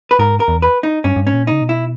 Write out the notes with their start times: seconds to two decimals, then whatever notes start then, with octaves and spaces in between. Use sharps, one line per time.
0.11 B4
0.19 G#2 A#4
0.40 A#4
0.48 E2
0.62 B4
0.83 D#4
1.04 G2 C#4
1.16 G2
1.25 G#2 C#4
1.33 A#2
1.47 C#3 D#4
1.61 B2
1.69 E4